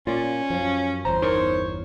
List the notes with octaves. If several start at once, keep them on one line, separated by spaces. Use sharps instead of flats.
A#2 C#4 F4 D5
F#2 F3
G1 E2 C5 A#5
D#4 A#4 C#5 C6